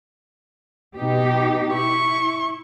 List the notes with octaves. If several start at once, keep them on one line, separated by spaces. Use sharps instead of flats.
B2 D#4 G4
E4 C#6